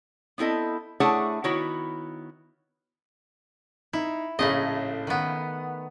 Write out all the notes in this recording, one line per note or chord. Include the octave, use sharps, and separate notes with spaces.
B3 C4 E4 A4 D#5
A3 D4 E4 G#4 C#5 F#5
D#3 B3 E4 F#4 C#5
D#4 E4
A#1 A2 C#3 A3 D#5
D#3 B3